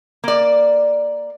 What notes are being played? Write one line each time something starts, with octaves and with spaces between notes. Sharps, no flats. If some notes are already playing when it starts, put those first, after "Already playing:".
A#3 D5